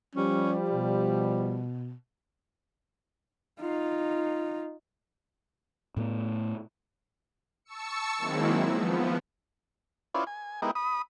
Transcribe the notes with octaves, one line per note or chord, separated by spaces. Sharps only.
F3 G3 C#4
B2
D#4 F4
A2 A3 B3
A5 C#6 E6 C#7
D#3 F#3 G#3 A#3 C4 E4
F3 B3
C#4 E4 F4 B4 C5 D5
G#5
G#3 B3 D#4 E4 G4 A#4
B5 D#6